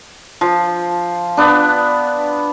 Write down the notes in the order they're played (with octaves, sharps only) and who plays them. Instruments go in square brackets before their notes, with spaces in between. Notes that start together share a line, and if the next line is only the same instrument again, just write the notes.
[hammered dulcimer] F3
B3 D4